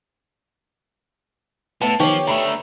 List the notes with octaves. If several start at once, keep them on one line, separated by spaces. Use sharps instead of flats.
A2 B3 A5
D#3 F3 G4 C#5 D6
D3 A3 A#5 B5